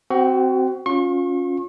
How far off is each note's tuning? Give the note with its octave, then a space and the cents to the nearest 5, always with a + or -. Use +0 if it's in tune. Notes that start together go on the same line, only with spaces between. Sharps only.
C4 -10 F#4 +20
C#4 +0 F4 +25 C#6 -40